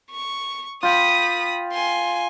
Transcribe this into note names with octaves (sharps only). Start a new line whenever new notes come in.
C#6
F4 G5 B5 D#6
G#5 C6